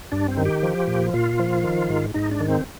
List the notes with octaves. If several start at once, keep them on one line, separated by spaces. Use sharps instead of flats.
G2 D4
C4
D#3
G4
F3
A#2
A#2 F4
F3
D#3
G#2
G#2 D#4
D4
D#3
C4